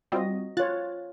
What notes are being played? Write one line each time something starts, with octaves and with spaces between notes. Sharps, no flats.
G3 C4 F4 F#4 D#5
F4 C#5 F#6 A6